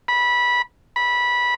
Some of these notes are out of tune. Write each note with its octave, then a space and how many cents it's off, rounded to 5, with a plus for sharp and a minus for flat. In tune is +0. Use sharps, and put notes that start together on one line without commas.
B5 -15
B5 -15